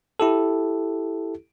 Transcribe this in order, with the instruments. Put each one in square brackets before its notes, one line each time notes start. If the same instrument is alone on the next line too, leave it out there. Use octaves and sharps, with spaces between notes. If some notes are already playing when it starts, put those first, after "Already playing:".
[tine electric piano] E4 G4 A4